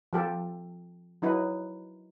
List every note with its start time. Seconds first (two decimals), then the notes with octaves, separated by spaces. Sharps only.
0.13 F3 G4 A4
1.22 F#3 D#4 E4 B4